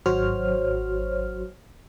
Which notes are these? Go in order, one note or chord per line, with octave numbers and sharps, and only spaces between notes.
G#1 F#3 F#4 C5 C#5 F6